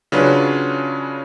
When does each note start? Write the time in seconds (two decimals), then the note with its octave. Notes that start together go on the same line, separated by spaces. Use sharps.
0.12 C#3 F#3 C#4 D4 F4 B4